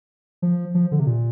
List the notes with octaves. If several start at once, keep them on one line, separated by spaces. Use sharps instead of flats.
F3
F3
D3
C3
A#2